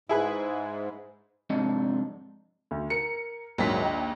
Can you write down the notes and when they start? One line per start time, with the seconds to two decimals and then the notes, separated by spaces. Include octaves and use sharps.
0.09 G#2 E4 G#4 B4
1.50 F2 G#2 C3 D4 D#4
2.71 D2
2.90 A#4 C#7
3.58 A#1 D#2 G#2 F#3 A#3 B6
3.82 D#5 G5